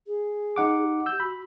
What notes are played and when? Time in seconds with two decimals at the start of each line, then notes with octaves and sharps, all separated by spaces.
0.07 G#4
0.56 D#4 F#5 D6
0.82 G4
1.06 E6 G6
1.20 F#4 B5